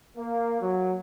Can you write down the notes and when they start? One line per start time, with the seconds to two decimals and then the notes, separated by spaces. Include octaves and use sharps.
0.17 A#3
0.61 F#3